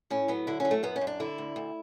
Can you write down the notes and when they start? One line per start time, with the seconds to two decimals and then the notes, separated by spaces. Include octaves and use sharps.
0.10 A2 C#4
0.28 F#3 B3
0.47 D3 E4
0.60 F#3 C#4
0.71 A3
0.83 F#2 B3
0.96 C#4
1.01 F#2
1.07 D4
1.20 D3 E4
1.38 D2
1.56 D2